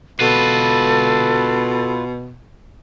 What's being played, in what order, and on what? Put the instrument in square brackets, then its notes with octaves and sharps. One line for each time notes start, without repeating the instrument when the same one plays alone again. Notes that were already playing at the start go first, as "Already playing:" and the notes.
[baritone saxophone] B2 [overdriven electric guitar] F4 B4 [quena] A4